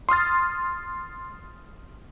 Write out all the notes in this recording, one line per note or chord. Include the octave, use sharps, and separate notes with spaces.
C6 D#6 F6 A6